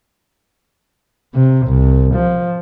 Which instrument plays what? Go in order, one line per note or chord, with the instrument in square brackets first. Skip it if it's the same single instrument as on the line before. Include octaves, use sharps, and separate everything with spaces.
[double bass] C3
C2
F3